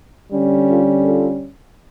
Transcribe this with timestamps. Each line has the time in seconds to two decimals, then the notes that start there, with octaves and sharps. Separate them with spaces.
0.32 D3 G3 C#4
0.69 F4 A4
1.05 F4 A4